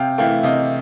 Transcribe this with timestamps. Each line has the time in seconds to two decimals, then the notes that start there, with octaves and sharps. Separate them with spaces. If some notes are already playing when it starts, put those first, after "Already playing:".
Already playing: C3 F5 G5
0.18 E3 A3 F5 G5
0.43 C3 D#5 F5